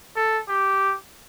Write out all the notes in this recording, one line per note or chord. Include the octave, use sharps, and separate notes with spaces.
A4
G4